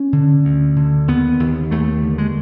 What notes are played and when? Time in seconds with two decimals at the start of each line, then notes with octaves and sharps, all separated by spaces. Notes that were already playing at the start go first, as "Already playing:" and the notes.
Already playing: C#4
0.13 D3
0.45 D2
0.76 D3
1.08 D#2 B3
1.40 D#2
1.71 D#2 A3
2.03 D3
2.18 G#3